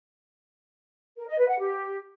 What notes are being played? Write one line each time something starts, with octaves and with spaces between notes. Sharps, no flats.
A#4
D#5
B4
F#5
G4